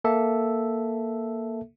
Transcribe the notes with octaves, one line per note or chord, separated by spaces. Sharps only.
A#3 A4 E5